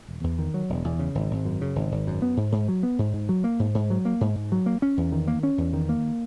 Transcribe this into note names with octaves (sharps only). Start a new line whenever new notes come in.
E1
E2
D#3
F#3
E1
E2
C#3
G#1
G#1
F#2
C#3
G#1
G#1
F#2
B3
G#2
G#2
F#3
B3
G#2
G#2
F#3
A#3
G#2
G#2
F#3
A#3
G#2
G#2
F#3
A#3
C#4
E2
D#3
A#3
C#4
E2
D#3
A#3